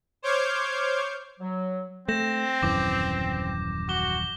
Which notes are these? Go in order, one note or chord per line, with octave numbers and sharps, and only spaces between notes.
C5 C#5 D6 F6 G6 G#6
F#3
A3 C4 G6 A#6 E7
D#1 F#2 E3 D6
F#4 D6 G7